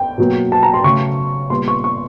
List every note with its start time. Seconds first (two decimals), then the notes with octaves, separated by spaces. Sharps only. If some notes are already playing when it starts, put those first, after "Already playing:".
Already playing: G5
0.18 B2 F#3 A#3
0.52 A5
0.63 A#5
0.74 C6
0.84 C#3 F#3 A3 C#6
1.50 A#2 G3 B3 C6
1.68 C#6
1.84 C#6